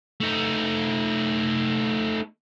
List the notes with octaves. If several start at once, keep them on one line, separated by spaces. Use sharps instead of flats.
A3 D#4